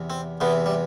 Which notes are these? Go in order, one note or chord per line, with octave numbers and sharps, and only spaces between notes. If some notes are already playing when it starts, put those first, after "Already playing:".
Already playing: E2 C3 E3
C4
E2 C3 E3 B3
G3